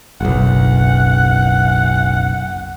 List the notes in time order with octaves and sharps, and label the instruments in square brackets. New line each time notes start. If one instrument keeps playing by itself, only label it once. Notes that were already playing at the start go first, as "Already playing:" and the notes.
[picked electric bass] F#1 B1 [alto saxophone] F#5